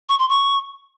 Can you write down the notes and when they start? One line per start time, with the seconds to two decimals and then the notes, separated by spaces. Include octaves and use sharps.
0.09 C#6
0.19 C6
0.29 C#6